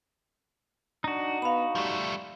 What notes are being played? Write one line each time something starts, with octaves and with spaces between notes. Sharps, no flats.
D4 D#4 F#4
B3 F5 B5
F3 G3 A3